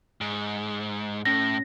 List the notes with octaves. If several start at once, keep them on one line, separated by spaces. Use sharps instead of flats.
G#2
A2 C#4 A#6